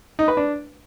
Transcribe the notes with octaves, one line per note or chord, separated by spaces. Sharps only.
D#4
B4
D4